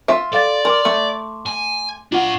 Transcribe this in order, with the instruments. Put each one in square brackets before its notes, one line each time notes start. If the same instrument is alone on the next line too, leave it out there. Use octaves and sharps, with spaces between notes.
[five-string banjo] F4 E5
[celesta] A4 F5 A6 [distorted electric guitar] D5
[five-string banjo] A#4 [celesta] C6 D6
[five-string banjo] A3
[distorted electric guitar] G#5
[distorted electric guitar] D4 F5 [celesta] F4 F#5